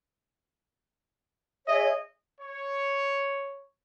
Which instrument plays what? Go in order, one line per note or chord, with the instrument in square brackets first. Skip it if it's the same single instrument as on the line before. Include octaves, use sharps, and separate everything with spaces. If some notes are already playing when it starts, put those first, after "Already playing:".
[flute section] G#4 C#5 E5 [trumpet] D#5
[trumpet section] C#5